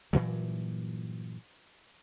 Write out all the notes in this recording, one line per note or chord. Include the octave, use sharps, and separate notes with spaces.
G2 A#2 E3 F#3